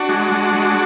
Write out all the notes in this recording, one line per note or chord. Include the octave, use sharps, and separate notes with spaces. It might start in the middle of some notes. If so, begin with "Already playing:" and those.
Already playing: D4 F#4
G#3
G#3
G#3